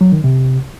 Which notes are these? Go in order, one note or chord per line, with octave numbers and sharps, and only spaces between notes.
F#3
D#3
C3